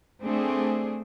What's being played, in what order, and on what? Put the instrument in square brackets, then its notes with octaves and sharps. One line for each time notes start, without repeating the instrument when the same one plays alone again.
[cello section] A3 C4 D4 G#4